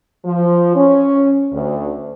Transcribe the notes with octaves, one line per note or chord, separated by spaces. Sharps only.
F3
C#4
D2